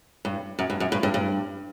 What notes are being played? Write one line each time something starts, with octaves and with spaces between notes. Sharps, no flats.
G2
F#2
G2
F#2
G2
G2
G2